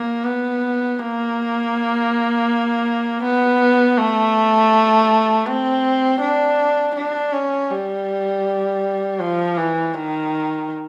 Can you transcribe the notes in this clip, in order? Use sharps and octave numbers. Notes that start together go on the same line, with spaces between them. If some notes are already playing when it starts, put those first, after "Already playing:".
Already playing: A#3
B3
A#3
B3
A3
C4
D4
D4
C#4
G3
F3
E3
D#3